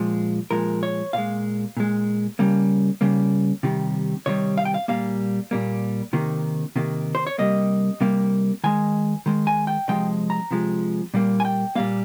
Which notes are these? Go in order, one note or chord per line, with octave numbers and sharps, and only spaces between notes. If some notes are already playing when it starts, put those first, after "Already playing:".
Already playing: A#2 F3 G#3
A#2 F3 G#3 A#4
C#5
A#2 G#3 F5
A#2 G#3
C#3 G3 A#3
C#3 G3 A#3
C3 D#3 G3
C3 D#3 G3 C#5
F5
G5
F5
A#2 G3 A#3 F5
A#2 G3 A#3
C3 D#3 A#3
C3 D#3 A#3
C5
C#5
C3 G3 A#3 D#5
C3 G3 A#3
D#3 G#3 G#5
D#3 G#3
G#5
G5
C3 F3 G#3 G5
A#5
C3 F3 G#3
A#2 G3 A#3
G#5
G5
A#2 G3 A#3 F5